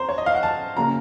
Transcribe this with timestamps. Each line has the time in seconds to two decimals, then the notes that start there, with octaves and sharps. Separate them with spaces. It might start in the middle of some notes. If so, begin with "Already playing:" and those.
Already playing: C4 C5 A#5
0.09 C#5
0.18 D#5
0.26 F5
0.35 F#5
0.43 A5
0.77 C#3 F#3 A#3 C#4 A#5